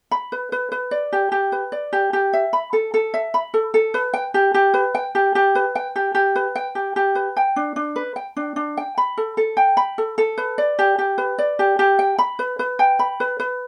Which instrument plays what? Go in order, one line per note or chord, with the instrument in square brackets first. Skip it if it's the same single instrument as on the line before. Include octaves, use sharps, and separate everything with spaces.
[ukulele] B5
B4
B4
B4
D5
G4
G4
B4
D5
G4
G4
E5
B5
A4
A4
E5
B5
A4
A4
B4
G5
G4
G4
B4
G5
G4
G4
B4
G5
G4
G4
B4
G5
G4
G4
B4
G5
D4
D4
B4
G5
D4
D4
G5
B5
A4
A4
G5
B5
A4
A4
B4
D5
G4
G4
B4
D5
G4
G4
G5
B5
B4
B4
G5
B5
B4
B4